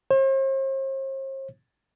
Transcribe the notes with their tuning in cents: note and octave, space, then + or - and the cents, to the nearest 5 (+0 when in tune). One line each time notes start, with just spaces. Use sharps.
C5 +45